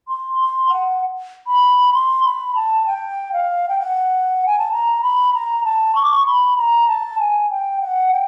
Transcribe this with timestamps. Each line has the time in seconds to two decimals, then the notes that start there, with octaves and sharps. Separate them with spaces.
0.08 C6
0.40 C6
0.70 F#5
1.47 B5
1.94 C6
2.24 B5
2.55 A5
2.86 G5
3.33 F5
3.69 G5
3.80 F#5
4.46 G#5
4.59 A5
4.72 A#5
5.02 B5
5.34 A#5
5.65 A5
5.95 C#6
6.03 D6
6.11 C#6
6.27 B5
6.57 A#5
6.88 A5
7.19 G#5
7.50 G5
7.81 F#5
8.12 G5